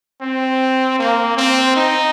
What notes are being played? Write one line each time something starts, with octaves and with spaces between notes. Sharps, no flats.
C4
A#3
C4
D#4